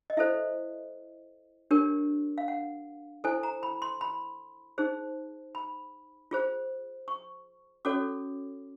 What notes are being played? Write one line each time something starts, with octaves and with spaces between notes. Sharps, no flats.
D#5
E4 A4 C5 E5
D4 G4 A#4 C#5
F5
F#5
E4 A4 C5 G#5
A#5
B5
C6
B5
D#4 G#4 C5
B5
F4 G#4 C5
C#6
C#4 F#4 A4 C#5 D6